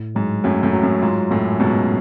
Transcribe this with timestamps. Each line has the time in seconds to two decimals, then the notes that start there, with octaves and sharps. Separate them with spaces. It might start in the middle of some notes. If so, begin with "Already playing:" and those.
Already playing: A2
0.15 G#2 F#3
0.44 F#2 A2 F#3
0.63 F#2 A2
0.73 F#3
0.83 F#2
1.02 G#2 F4
1.31 F#2 A2 C#4
1.59 G#2 B2 F#3